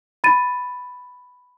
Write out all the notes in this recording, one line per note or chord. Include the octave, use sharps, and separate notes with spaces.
B5 A6 D#7